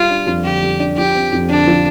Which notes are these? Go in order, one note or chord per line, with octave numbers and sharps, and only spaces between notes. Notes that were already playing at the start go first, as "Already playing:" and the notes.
Already playing: G3 F4
D4
F2
D3 G4
G3
D4
F3 G4
C4
F2
D3 D4
F3